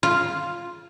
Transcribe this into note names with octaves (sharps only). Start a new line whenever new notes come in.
F4